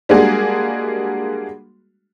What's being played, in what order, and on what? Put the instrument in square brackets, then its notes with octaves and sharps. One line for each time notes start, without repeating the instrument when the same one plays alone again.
[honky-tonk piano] G3 G#3 A#3 D4 F#4 G#4